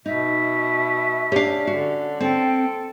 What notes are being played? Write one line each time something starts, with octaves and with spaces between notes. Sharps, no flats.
B2 D#4 E5
C#4 D4 G4 F5
D3 F#4
C4 A4 G5